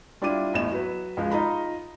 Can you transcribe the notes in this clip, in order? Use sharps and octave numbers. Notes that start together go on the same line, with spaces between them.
G3 D4 E4 F4 D6 D#7
A1 E2 A2 E7
F#3 B4
C#2 F3 G#3
D#4 F4 D#5 A#5 B5